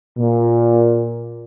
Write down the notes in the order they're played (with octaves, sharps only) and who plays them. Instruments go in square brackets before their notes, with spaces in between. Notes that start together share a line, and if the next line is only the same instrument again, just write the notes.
[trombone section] A#2